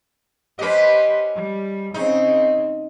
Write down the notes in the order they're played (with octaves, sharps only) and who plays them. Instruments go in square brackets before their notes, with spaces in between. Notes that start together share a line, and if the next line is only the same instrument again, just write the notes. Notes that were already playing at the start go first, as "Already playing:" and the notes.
[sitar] C#4 D#5 [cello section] G4 B4 C5
[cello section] G3
[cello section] C#3 C4 [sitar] D#4